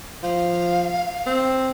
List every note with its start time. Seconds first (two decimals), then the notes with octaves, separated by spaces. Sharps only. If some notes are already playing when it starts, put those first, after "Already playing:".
0.23 F3 F5
1.26 C4